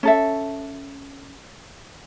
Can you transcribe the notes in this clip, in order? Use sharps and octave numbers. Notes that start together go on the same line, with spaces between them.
C#4 A4 E5